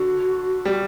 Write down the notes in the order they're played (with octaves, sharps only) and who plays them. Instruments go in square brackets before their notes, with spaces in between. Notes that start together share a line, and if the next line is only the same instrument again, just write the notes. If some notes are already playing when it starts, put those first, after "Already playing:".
Already playing: [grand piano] D3 [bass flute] F#4
[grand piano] G3